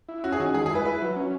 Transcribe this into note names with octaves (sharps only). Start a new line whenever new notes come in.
E4
C#4 F#4
G#4
D#3 F#4
G#3 G#4
G#4
E4 B4
E4 B4
F#3
C#4